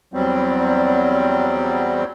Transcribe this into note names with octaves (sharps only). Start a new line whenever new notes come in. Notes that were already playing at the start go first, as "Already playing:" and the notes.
E2 F#3 G3 C4